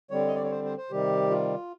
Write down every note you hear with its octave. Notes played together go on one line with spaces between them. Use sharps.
D3 G3 C4 C#5
D#5
D5
C#5
C5
C5
C5
C3 D#3 G3 G4
F4